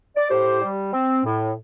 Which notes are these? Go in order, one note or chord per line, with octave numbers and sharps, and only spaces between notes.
D5
A2 G4 C5
G3
C4
A2